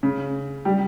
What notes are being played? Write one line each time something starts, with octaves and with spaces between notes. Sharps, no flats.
C#3
G3